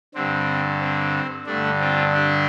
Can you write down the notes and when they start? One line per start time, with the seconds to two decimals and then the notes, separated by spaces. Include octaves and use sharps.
0.14 G2 D3 C4
0.81 C4
1.46 G2 D3 A3 D4
1.80 C4 F4
2.13 D4 G4